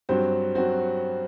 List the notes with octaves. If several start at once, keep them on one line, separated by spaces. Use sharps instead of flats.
G2 F#3 C4 F#4 C5
F#3 C4 F#4 C5